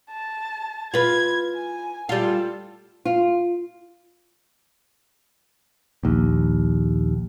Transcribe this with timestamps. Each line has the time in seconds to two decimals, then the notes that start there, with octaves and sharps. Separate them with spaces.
0.11 A5
0.94 F4 B4 G#6
1.55 G#5
2.09 G3 F4 A4
3.05 F4
6.03 A#1 D#2